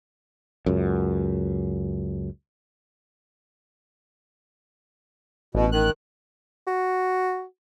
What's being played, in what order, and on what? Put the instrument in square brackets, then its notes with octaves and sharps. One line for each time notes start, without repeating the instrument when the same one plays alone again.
[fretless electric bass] C#2 F#2
[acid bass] A1 [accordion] B2
[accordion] D#3 F#6
[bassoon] F#4